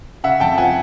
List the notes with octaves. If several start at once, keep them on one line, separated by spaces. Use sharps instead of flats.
C#3 E5 F#5
F2 G5 A5
F3 F#5 G#5